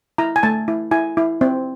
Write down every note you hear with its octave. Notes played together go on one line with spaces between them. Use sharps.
E4 A#5
G#5
A3 A5
E4
E4 G#5
E4
C4